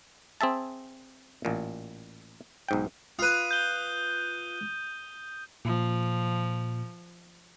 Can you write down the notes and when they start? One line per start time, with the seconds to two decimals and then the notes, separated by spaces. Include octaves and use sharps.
0.41 C4 G#4 E5 A5
1.45 A1 A#2
2.69 B1 G#2 G5
3.19 F4 B4 D#6 D#7
3.51 G6 G7
5.65 A#2 F3